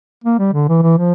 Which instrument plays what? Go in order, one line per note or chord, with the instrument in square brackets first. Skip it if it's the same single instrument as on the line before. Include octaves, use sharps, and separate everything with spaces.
[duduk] A#3
G3
D3
E3
E3
F3